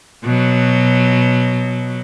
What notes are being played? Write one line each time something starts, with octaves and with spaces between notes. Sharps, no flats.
B2 F#3